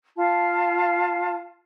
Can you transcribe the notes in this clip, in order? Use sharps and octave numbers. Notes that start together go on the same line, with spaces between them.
F4 F5 A5